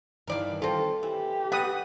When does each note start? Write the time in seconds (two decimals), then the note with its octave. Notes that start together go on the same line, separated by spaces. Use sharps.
0.27 G2 D#3 E3 A#4 D5 F5
0.62 C4 F4 A4
1.03 E3 G4
1.52 G3 B3 F#5 B5 D#6